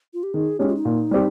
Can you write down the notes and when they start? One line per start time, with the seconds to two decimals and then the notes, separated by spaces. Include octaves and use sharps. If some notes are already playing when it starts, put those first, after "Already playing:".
0.14 F4
0.23 G4
0.34 D#3 G#4
0.59 G#3 C#4 D#4 G4
0.68 F4
0.76 D#4
0.85 A#2
1.11 G3 C4 G4